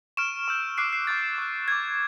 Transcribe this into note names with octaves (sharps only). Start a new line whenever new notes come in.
C#6 F6 D7 E7
C#6 E6 G6
D6 F#6 C7 D7
C7
D6 G6 A6
C#6 F#6
D6 F#6 G#6